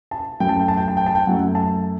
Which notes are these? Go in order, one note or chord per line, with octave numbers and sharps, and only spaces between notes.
A5
F#2 F#3 A3 G5
A5
G5
A5
G5
A5
G5
A5
G5
F#2 F#3 A3 F#5
A5